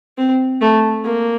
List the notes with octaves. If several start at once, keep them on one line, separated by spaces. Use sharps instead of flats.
C4
A3
A#3